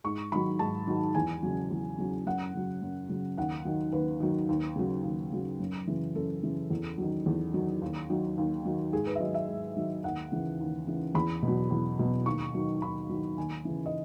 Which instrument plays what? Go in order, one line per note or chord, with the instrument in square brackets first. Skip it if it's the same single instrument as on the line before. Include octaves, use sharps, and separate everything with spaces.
[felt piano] G#2 C#6
D#3 F#3 B5
G#2 A5
D#3 F#3
E2 G#5
C#3 F#3
E2
C#3 F#3
F#2 F#5
C#3 F#3
F#2
C#3 F#3
D#2 F#5
D#3 F#3
D#2 B4
D#3 F#3
D#2
C#3 F#3
D#2
C#3 F#3
F#2
C#3 E3
F#2 A4
C#3 E3
E2
D#3 F#3
E2
D#3 F#3
D#2
D#3 F#3
D#2
D#3 F#3
G#2 G#4
B4
E5
D#3 F#3 D#5
E5
G#2
D#3 F#3
D#2 F#5
C#3 E3
D#2
C#3 E3
E2 B5
B2
F#3
E2
B2 F#3
D#2 C#6
D#3 F#3
D#2 B5
D#3 F#3
D#2 G#5
C#3 E3
D#5